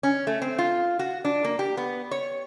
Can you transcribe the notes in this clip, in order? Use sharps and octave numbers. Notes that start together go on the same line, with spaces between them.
C#4
A3
C4
F4
F#4
D4
A#3
G4
B3
C#5